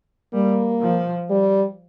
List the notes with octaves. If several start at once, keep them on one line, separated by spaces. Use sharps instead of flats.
G3 A#3
F3
G3